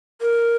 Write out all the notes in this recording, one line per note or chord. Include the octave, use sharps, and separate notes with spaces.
A#4